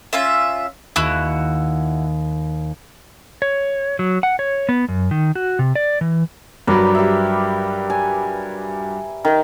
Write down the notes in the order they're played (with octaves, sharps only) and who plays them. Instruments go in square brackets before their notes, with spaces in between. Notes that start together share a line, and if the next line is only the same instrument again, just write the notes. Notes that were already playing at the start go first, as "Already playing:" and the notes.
[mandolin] C#4 F4 E5
[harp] D#2 [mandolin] E4 F#4 F#6
[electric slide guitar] C#5
F#3
F#5
C#5
B3
F#2
D#3
F#4
C3
D5
E3
[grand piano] G2 F#3 [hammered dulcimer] A#4 B4 D5
[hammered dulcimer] G4 E5
G#5
D#3